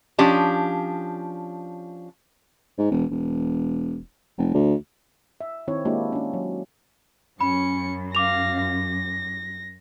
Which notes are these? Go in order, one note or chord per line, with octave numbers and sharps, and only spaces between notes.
F3 C#4 D4 G4
G#2
E1
E1
F1
D2
E5
D#3 C4 E4 C#5
G#3 A#3 D4 E4 F#4 G4
C#4 D4
F#3
F#2 C#4 B5 C#7
F5 D6 A#6 F7
A#6